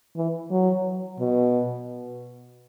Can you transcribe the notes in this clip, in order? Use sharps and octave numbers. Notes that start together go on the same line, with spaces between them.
E3
F#3
B2